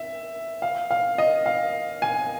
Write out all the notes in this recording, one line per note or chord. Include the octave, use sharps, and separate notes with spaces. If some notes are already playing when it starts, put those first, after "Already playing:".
Already playing: E5
F5
F5
D#5
F5
G#5